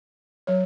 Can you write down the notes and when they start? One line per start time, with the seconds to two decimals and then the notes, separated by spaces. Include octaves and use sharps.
0.47 F#3 C#5